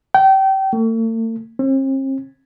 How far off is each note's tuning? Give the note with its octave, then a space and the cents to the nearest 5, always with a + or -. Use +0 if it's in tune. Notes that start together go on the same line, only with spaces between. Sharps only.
G5 -30
A3 +45
C4 +45